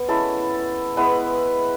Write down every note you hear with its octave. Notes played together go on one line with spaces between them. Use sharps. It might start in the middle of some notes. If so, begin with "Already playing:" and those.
Already playing: B3
G#3 C#4 E4 A4
G#3 B3 E4 B4